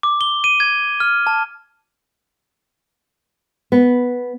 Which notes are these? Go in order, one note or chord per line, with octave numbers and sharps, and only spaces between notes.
D6
G7
D#7
G#6
F6
A5
B3